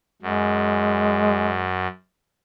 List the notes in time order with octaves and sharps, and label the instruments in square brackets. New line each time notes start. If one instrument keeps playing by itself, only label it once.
[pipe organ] F#2 [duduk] G#3